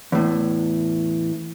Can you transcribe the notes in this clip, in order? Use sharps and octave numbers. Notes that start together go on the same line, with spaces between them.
E2 A2